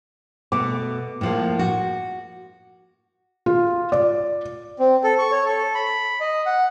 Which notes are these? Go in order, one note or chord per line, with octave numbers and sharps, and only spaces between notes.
B2 A3 D6
A2 F3 A#3
F#4
F4
D5
C4
A4
C#6
C#5
A4
B5
D#5
F#5